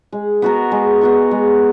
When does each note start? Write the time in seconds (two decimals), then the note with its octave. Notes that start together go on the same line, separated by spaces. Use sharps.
0.12 G#3
0.42 B3 F#4 A#4
0.72 G#3
1.01 B3 F#4 A#4
1.31 G#3